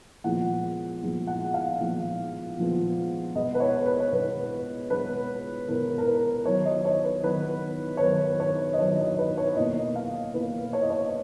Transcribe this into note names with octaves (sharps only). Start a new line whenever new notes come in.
A#2 F3 G#3 B3 F#5
A#2 F3 G#3 B3
F#5
F5
A#2 F3 G#3 B3
A#2 F3 G#3 B3
B2 G#3 B3 D#5
B4
C#5
B4
C#5
B2 G#3 B3 B4
B2 G#3 B3 B4
B2 G#3 B3 A#4
A#4
B4
D#3 F#3 B3 C#5
D#5
C#5
B4
D#3 F#3 B3 B4
C#5
D#3 F#3 B3 B4
C#5
D#5
D#3 F#3 B3 C#5
D#5
B4
C#5
B2 A#3 D#5
F5
B2 A#3 B4
C#5
D#5
C#5